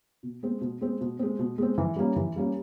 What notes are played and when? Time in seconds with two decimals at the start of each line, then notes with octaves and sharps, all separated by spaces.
0.23 B2
0.43 G#3 C4
0.61 B2
0.81 G#3 C4
1.01 B2
1.19 G#3 C4
1.39 B2
1.58 G#3 C4
1.78 E3
1.96 G3 A#3 C#4
2.16 E3
2.36 G3 A#3 C#4